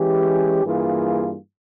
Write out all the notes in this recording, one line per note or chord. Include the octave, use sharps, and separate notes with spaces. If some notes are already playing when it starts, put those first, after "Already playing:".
Already playing: E3 G#3 C#4 G4
G2 E3 A#3 F4 G#4